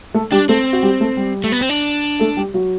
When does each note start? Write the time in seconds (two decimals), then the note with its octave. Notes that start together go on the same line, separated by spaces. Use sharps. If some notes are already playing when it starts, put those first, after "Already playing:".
0.14 A3 A4
0.31 G3 D4 G4
0.49 A3 C4 A4
0.73 F#4
0.83 G3 G4
1.00 A3 A4
1.17 G3 G4
1.44 A3
1.52 B3
1.61 C4
1.69 D4
2.19 A3 A4
2.37 G3 G4
2.54 F#3 F#4